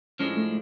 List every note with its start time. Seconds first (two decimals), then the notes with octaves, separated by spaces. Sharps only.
0.19 A2 F3 G#3 C#4 D4
0.37 A3